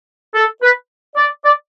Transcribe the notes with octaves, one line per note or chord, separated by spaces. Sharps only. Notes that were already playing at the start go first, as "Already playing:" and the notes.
A4
B4
D5
D5